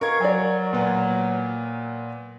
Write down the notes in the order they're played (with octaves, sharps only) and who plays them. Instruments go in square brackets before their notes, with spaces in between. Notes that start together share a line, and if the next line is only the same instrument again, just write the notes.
[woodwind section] B2 F5 C#6 [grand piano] A#4 G#6
[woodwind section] F#3 [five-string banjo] D5 G#5
[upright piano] A#2 B3